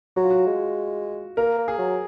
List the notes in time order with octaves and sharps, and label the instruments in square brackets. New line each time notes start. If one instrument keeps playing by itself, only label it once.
[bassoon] F#3 [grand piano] F#4
[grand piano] F4
F#4
[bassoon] G#3
[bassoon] A#3 [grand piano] A#4
[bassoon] A#3
[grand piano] G#4
[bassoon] F#3